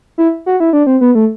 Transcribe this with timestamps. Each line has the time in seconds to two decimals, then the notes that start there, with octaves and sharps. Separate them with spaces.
0.18 E4
0.46 F#4
0.60 E4
0.73 D4
0.87 C4
1.01 B3
1.15 A3